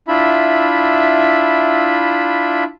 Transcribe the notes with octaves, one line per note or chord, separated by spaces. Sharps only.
D4 E4 F4 E5 B5